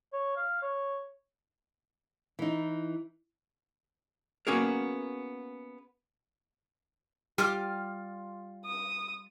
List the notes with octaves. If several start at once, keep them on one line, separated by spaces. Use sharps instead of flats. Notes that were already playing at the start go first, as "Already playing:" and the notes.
C#5
F5
C#5
E3 D#4
A#3 B3 C#4 F#4 G#4 A#4
G3 F4 G4 D6 F6
D#6